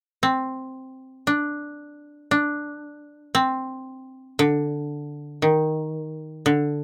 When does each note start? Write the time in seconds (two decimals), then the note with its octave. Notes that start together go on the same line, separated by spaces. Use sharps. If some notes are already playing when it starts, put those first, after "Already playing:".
0.23 C4
1.27 D4
2.31 D4
3.35 C4
4.39 D3
5.42 D#3
6.46 D3